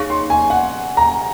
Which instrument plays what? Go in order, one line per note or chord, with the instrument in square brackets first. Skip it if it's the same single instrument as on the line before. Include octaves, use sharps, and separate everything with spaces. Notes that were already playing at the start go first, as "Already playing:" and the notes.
Already playing: [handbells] D#4 G#4 C#5 F5 [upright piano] C#6
[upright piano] C6
G#5
F#5
A#5